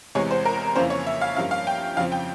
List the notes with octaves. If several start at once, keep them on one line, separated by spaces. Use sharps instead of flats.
E2 C3 E3 G#3 C#5
C5
A#4
F2 C#3 E3 A#3 C#4 C5
C#5
E5
F5
G2 F3 A#3 C#4 F5
F5
G5
F2 C#3 F3 C4 F5
G5